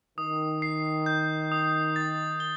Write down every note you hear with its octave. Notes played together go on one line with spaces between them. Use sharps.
D#3 D#6
C7
G6
D#6
A6
G7